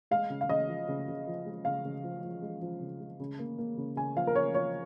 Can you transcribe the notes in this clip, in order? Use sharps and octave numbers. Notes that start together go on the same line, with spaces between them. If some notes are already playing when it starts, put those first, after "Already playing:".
G#3 F5
C#3
F5
C#3 D#5
F3
C#3
C#3
F3
G#3
C#3 F5
C#3
F3
F3
G#3
F3
C#3
G#3
C#3
A#3
A#3
C#3
C#3 G#5
F3 F5
A#4
C#3 C#5
F3 C#5